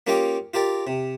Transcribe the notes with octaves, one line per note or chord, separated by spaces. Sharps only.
A#3 C#4 F4 G4 D#5 G5
F4 G4 A#4 D5
C3